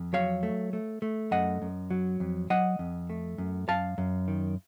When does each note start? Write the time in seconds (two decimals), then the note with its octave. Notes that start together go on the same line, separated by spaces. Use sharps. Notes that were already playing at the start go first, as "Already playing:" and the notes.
Already playing: F2
0.13 F#3 C#5 F5
0.43 A3
0.73 A3
1.02 A3
1.31 F#2 D#5 F#5
1.62 F#2
1.91 F#3
2.20 F2
2.50 F#3 D#5 F#5
2.79 F2
3.10 A3
3.38 F#2
3.68 F#2 F5 A5
3.98 F#2
4.28 D#3